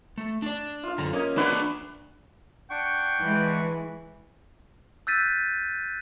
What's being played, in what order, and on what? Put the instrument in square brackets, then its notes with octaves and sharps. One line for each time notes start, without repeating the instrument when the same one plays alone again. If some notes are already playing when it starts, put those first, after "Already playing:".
[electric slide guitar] A3
D4 D5
[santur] F4 F5
[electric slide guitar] F#2 D3 [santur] A#5
[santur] A#3 D#5 [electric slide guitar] C#4
[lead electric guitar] D4 C5 [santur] B4 F#5 C#6
[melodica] D4 F#5 C#6 [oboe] G5
[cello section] E3 G#3
[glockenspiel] E6 F#6 G6 A6 B6 D#7